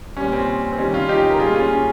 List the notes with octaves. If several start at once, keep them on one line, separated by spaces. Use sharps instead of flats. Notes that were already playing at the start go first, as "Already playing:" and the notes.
A#2 G3 C#4
C4
C4
C3 D#3 G3 C#4
C#4 F4
D#4 G4
A#4
A#2 G3 F4 G#4
C#4 F4
C#4